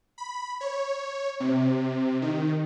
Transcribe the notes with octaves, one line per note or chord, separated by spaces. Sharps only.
B5
C#5
C3
D#3